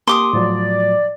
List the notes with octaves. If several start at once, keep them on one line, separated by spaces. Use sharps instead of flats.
A#3 G4 C6 D6 D#6
A2 F3 F#3 D5